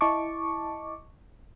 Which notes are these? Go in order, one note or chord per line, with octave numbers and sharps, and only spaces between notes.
E4 D#5 A5 C#6 D6